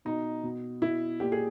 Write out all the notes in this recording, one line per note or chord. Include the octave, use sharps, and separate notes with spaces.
B2 D#4
B2
B2 E4
A#2 G4
G#4